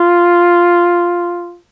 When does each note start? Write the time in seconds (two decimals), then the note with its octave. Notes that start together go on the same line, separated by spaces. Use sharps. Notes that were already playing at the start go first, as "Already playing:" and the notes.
Already playing: F4